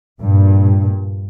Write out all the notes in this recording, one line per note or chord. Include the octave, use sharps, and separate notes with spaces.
G2 A#2